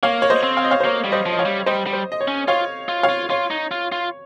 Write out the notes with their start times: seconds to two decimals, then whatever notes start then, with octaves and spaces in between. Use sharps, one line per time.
0.03 A#3 C#5 F5
0.22 C#5
0.30 C5 D#5
0.43 C4
0.57 F5
0.64 D#5
0.71 C#5 F5
0.80 C5
0.85 A#3 C#5
1.04 G3
1.12 C5 D#5
1.26 F3
1.32 D#5
1.39 C#5 F5
1.46 G3
1.66 G3 C5 D#5
1.87 G3
1.93 C5
2.12 D#5
2.21 C#5
2.28 C#4
2.48 F4 C#5 F5
2.89 F4
3.03 C#5 F5
3.09 F4
3.30 F4 C#5
3.51 D#4
3.71 F4
3.92 F4